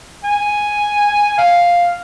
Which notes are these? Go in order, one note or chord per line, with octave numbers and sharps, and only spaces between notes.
G#5
F5